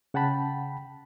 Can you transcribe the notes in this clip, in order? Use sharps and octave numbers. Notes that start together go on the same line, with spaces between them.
C#3 F#5 G5 A5 B5